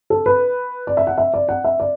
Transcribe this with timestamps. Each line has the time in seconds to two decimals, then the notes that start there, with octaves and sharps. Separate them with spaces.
0.10 A4
0.26 B4
0.87 D5
0.97 E5
1.07 F#5
1.18 E5
1.34 D5
1.48 F#5
1.64 E5
1.80 D5